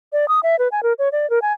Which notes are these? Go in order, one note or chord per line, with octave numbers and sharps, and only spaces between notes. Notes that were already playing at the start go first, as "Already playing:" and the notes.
D5
D#6
E5
B4
G#5
A#4
C#5
D5
A#4
G#5